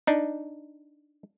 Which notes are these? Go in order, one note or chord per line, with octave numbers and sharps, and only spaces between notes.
D4 D#4